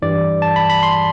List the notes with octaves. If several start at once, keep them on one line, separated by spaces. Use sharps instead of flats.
G2 E3 G3 D5
A5
B5
B5
C6